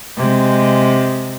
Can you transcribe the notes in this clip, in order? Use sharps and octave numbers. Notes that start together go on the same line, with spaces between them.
C3 G#3